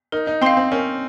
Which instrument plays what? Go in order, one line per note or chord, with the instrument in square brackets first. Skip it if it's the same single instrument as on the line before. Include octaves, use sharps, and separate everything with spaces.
[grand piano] D#4 [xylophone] A#4
[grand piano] D#4
[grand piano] C4 [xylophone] F5 C6
[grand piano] C4
[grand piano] C#4 [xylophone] A#4